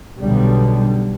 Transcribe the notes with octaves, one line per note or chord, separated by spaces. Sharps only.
B1 B2 D3 G3